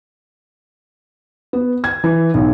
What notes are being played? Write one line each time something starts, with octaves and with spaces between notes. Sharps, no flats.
B3
G#6
E3
B1